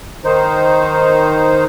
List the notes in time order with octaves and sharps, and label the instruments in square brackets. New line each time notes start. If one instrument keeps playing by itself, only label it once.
[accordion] D#3 D#4 C5